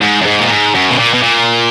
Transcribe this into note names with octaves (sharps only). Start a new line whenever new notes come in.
G#2
F#2
G#2
A#2
G#2
F#2
B2
A#2
B2
A#2